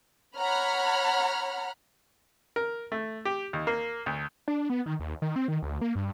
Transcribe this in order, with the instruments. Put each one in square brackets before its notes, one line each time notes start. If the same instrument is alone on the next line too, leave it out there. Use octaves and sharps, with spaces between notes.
[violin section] C#5 F#5 A#5 B5 F6
[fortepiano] A#4
A3
G4
D#2
A#3
D2
[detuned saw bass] D4
B3
D#3
D#2
D#3
C4
D#3
D2
A#3
G2